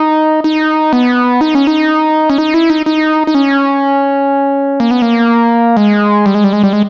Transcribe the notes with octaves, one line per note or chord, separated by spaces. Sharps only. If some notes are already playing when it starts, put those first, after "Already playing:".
Already playing: D#4
D#4
B3
D#4
C#4
D#4
C#4
D#4
E4
D#4
D#4
D#4
C#4
A#3
B3
A#3
G#3
G3
G#3
G3
G#3
G3
G#3